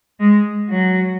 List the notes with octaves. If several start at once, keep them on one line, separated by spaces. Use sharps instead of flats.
G#3
F#3